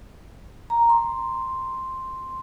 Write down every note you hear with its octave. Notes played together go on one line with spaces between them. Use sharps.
A#5
C6